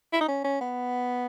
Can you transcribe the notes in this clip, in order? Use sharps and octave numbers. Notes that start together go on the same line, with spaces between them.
E4
D#4
C#4
C#4
B3